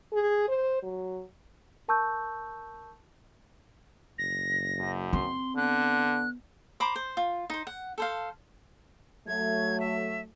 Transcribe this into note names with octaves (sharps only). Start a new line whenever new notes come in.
G#4
C5
F#3
A#4 A5 C#6 E6 G6
F#1 A#6
F#2
C4 C6
D3 B3 F#6
C5 A#5 B5 D6
C5
F4
D#4 C5
F#5
A4 C5 F5
F#3 A3 G#6
E5